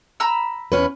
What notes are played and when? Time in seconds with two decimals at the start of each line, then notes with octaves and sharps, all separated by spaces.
0.20 A#5 B5 E6
0.72 E2 C#4 B4